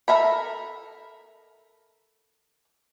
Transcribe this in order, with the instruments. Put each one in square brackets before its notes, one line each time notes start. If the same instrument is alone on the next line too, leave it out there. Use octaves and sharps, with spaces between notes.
[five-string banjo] A4 A#4 E5 B5